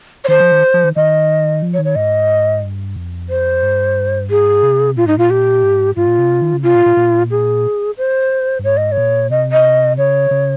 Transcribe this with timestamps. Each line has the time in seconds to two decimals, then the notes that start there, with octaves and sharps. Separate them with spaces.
0.25 C#5
0.28 D#3 C5
0.40 F3
0.52 D#3
0.74 F3
0.84 D#3
0.96 D#3 D#5
1.62 F3
1.74 C#5
1.79 D#3
1.85 C#5
1.96 G#2 D#5
2.63 G2
2.96 F2
3.30 C5
3.63 G2
4.29 G#2 G#4
4.63 C3
4.96 A#2 F4
5.06 G#2 D#4
5.17 A#2 F4
5.30 G4
5.63 G#2
5.96 G#2 F4
6.07 A#2
6.19 C3
6.42 D#3
6.53 C#3
6.63 C3 F4
6.75 A#2
6.86 A#2
6.97 A#2
7.31 G#4
7.98 C5
8.59 G2
8.64 G#2 C#5
8.77 D#5
8.92 C#5
8.97 A#2
9.30 C3 D#5
9.52 D#5
9.98 C#3 C#5
10.31 C#3